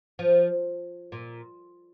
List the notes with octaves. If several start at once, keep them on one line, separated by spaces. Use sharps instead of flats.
F3
A#2